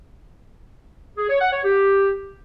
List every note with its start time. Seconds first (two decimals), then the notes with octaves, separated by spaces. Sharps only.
1.17 G#4
1.29 C#5
1.41 F#5
1.52 C#5
1.64 G4